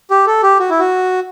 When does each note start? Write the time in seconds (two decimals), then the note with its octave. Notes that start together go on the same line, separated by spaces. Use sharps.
0.11 G4
0.27 A4
0.43 G4
0.59 F#4
0.70 E4
0.80 F#4